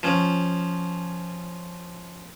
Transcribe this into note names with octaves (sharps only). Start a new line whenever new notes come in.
F3 C#4